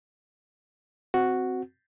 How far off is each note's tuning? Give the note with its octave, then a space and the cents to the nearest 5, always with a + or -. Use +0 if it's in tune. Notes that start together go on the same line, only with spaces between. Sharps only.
C4 -15 F#4 +0